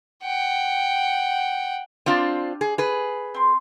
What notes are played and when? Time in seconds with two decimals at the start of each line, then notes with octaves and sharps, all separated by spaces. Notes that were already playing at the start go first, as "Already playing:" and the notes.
0.23 F#5 G5
2.06 C4 D4 F4 G4 C6 D#6
2.61 G#4
2.78 G#4 B4
3.34 C4 C6